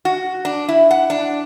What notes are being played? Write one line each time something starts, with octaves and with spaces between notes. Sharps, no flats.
F#4
D4
E4
F#5
D4